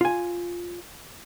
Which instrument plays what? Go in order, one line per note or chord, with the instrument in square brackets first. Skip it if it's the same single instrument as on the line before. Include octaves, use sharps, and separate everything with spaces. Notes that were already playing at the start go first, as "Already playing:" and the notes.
[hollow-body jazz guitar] F4 G#5